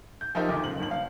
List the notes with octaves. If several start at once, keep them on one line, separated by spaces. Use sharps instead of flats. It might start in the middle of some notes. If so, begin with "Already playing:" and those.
G6
F3 D#4 G4 A#4 E5 G7
F1 D2 D#3 D#5 D6
F#1 C#2 F#7
D#1 G2 F#7
F5